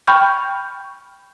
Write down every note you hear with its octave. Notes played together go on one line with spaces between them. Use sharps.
G5 B5 C#6 F6 G6